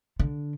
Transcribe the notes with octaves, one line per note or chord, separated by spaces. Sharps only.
D3